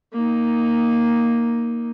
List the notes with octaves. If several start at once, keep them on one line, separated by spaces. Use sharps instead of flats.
A#3 D#4